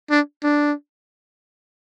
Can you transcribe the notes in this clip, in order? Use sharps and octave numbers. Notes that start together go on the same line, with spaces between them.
D4
D4